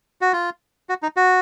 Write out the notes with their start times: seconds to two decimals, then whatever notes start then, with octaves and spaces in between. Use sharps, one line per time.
0.21 F#4
0.33 F4
0.89 F#4
1.03 D#4
1.16 F#4